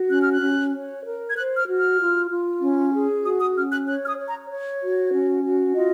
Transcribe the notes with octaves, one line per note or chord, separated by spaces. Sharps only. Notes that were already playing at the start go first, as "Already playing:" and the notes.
Already playing: F#4
C#4 F#6
F6
F#6
C#4
C#5
A#4
G#6
C5 F#6
F6
F#4
F6
F4
F4
C#4
G#4
F#4 D#6
D#6
C#4 F6
F#6
C#5 F#6
F6
D#6
C#5
A#5
C#5
F#4
C#4
F#4
F4 D#5